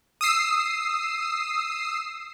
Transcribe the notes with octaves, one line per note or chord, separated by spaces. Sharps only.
D#6 E6 C7